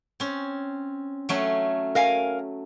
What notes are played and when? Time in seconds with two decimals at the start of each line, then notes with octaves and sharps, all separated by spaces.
0.20 C4 C#4
1.29 F#3 A3 C#4
1.95 A#4 F5 G#5